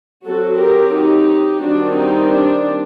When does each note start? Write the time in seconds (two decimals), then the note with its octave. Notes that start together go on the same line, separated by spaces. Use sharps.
0.24 F#3 C4 F#4 A4
0.59 G4 A#4
0.93 D#4 G4
1.62 D#3 G3 C4 D4 F#4
1.96 D#4
2.30 D4